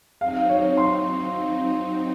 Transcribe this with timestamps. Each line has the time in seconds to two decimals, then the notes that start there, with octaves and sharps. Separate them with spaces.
0.21 F#3 C4 D#4 F5
0.50 C#5
0.77 C6